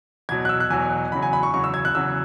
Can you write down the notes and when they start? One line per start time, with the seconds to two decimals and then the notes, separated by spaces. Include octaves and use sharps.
0.29 E2 B2 F#3 G#6
0.45 F#6
0.49 E6
0.60 F#6
0.70 E2 B2 F#3 G#5
1.12 E2 C#3 F#3 B5
1.22 G#5
1.33 B5
1.43 C#6
1.54 E2 C#3 F#3 C#6
1.64 E6
1.74 G#6
1.85 F#6
1.95 E2 C#3 F#3 E6